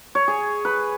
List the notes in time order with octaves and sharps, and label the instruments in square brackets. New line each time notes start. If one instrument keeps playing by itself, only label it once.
[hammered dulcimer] C#5
G#4
B4